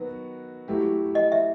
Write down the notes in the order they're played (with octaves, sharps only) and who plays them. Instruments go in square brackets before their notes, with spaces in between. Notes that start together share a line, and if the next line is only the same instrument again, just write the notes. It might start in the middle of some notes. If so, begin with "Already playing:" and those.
Already playing: [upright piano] D#3 F#3 B3 F#4
F#3 A3 E4 G4
[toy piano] D#5
E5